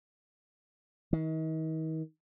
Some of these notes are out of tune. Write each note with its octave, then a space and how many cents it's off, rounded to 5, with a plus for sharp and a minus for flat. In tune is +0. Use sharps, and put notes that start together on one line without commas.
D#3 +40